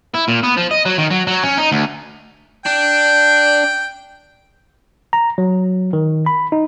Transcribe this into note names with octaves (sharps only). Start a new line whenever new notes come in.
E4
A#2
B3
F3
D#5
F#3
D#3
F#3
F#3
C#4
D#4
D2
D4 G5
A#5
F#3
D#3
B5
D#4